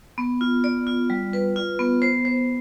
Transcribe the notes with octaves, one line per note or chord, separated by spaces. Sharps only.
B3
F4
D5
F4
G3
B4
F4
B3
C5
C5